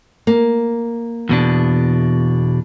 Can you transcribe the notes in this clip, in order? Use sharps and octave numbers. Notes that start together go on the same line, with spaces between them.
A#3
E2 B2 D4